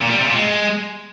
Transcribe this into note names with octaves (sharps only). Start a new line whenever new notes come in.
A#2
G3
C3
A#2
G#3